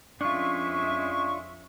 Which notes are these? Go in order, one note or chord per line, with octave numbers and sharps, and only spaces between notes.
F2 G#3 C#4 D4 F4 E5 C#6